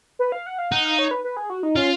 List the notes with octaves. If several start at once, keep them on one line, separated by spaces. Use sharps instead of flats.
B4
F5
F#5
F5
D#4 F#5
F5
C#5
B4
B4
G#4
F#4
D#4
C#4 F4